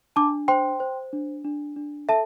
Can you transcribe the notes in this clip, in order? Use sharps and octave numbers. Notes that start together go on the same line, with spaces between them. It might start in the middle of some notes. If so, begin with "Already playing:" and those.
D4 A5 D6
C5 G5 C6
C5
D4
D4
D4
A4 E5 A5